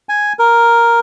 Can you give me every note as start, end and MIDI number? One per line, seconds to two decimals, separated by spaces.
0.09 0.33 80
0.39 1.00 70